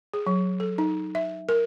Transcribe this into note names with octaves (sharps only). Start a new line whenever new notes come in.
G#4
F#3
A4
D#4
E5
A#4